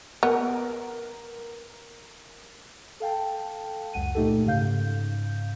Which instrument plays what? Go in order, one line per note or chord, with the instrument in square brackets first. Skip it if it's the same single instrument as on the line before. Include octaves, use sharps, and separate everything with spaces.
[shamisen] B3 [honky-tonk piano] A#4
[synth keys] A4 F5 G5 A5
C#2 F#2 F#5 D#7
A#2 A3 D#4 G4 A4
G#2 C#3 F5 G6